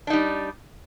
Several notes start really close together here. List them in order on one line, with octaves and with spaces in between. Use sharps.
D4 D#4 G3